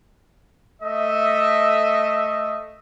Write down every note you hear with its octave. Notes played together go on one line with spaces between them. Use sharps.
A3 D#5 E5